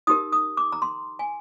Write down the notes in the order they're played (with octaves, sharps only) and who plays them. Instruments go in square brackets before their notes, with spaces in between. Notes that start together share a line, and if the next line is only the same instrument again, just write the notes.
[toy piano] D#4 G4 A#4 D#6
D#6
D6
A#5
C6
G#5